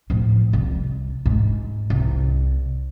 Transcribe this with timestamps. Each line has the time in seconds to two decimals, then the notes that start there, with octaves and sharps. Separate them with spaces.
0.10 A2 F3
0.53 C2
1.26 G#2 A3
1.90 C2